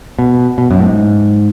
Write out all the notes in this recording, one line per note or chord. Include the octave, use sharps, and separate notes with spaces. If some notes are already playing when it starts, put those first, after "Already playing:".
B2
B2
F#2
A2
G#2